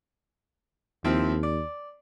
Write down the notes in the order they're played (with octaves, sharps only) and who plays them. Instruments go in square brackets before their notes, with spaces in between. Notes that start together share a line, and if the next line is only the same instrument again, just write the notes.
[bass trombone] D#2 [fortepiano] F3 C4 E4
[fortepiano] D5